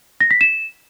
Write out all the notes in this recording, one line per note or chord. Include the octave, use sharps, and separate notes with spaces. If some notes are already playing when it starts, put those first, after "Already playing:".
A#6
B6
E7